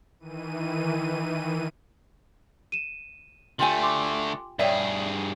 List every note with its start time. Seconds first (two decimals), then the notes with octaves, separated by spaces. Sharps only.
0.20 D#3 E3 D#7
2.72 D#7 E7
3.59 D3 A3 F4 G4 G#5
3.82 C6 D6
4.59 G2 G#4 C#5 D5 E5 G5